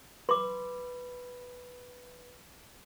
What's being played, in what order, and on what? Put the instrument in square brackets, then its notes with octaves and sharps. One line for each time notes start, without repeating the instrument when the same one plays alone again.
[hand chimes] B4 [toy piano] C6 D6